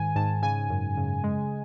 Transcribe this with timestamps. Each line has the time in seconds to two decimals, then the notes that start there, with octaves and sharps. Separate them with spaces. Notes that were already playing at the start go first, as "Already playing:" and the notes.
Already playing: G#2 D#3 G#5
0.16 G#2 A5
0.42 C#3 G#5
0.70 F#2
0.97 C#3
1.24 G#3